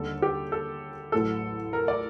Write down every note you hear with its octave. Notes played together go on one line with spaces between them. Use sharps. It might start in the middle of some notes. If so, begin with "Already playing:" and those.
Already playing: D#2 D3 G3 A4
G4
A4
A1 A2 F#3 A4
A#4
D5